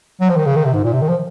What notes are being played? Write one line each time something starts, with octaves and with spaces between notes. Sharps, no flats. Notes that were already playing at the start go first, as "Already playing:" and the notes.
F#3
F3
D#3
C#3
D#3
C3
G#2
A#2
C3
D#3
F3